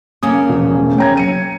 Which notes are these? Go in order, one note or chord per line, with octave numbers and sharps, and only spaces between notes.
C#3 A#3 C#4 D#6
E1 F3
A3
C#5 G5 A#5 G#6
F#3 C#7 D#7